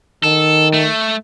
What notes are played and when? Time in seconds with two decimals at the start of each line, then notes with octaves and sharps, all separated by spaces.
0.23 D#3 A4
0.73 A3